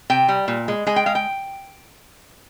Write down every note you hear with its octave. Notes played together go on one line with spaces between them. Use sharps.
C3 G5
G3
A#2
G#3
G#3 G#5
G5
G#3 F5
G5